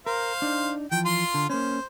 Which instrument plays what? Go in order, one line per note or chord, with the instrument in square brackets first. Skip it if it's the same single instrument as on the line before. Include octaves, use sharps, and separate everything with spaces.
[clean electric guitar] A#4 [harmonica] C5 F5
[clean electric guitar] D4 D#4
[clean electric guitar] E3 F3 [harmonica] G5
[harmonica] F4 C6
[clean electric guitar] D3
[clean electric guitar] A#3 C#4 [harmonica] C5